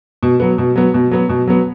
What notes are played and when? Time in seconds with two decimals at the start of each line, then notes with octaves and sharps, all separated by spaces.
0.23 B2
0.40 F#3 B3
0.58 B2
0.76 F#3 B3
0.94 B2
1.11 F#3 B3
1.29 B2
1.48 F#3 B3